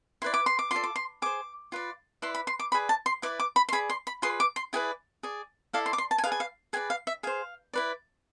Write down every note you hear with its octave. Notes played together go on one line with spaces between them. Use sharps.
E4 B4 D5 C6
D6
C6
D6
F4 A4 D5 C6
D6
C6
G#4 C5 D6
F4 B4 D5
E4 B4 D5 C6
B5
C6
D6
G#4 B4 D5 B5
A5
C6
E4 B4 D5 D6
D6
B5
C6
G#4 D5 B5
C6
B5
F4 G#4 B4 D5 C6
D6
C6
E4 G#4 B4 D5 G#5
G#4 D5
E4 A4 D5 F5
C6
D6
C6
A5
G#5
G#4 B4 D5 F5
G#5
F5
G#4 B4 D5 G#5
F5
E5
G#4 C5 F5
E4 B4 D5